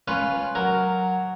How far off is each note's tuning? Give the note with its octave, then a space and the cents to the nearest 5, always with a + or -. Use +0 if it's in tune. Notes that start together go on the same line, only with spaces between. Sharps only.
C#4 +0 F4 +0 B4 +0
F#3 +0 A#4 +0